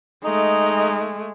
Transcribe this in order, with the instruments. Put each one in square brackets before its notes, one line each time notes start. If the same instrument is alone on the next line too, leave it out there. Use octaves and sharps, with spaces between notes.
[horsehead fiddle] G#3 A3 [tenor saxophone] D#4